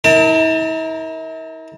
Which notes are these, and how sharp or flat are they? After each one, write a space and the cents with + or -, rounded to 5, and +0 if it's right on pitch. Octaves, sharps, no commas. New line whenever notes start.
E4 -45 A#4 +0 A5 +35